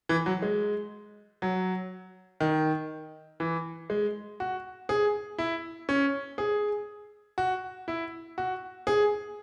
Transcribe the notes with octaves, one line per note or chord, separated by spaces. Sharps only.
E3
F#3
G#3
F#3
D#3
E3
G#3
F#4
G#4
E4
C#4
G#4
F#4
E4
F#4
G#4